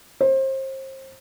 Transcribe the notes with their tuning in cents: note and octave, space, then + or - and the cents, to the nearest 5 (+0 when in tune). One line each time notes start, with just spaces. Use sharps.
C5 +30